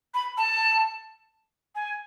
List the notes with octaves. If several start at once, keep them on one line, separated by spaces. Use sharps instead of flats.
B5
A5
G#5